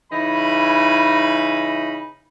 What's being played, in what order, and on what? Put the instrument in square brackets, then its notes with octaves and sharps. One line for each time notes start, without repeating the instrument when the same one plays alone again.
[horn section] C#3 E3 D#4 B5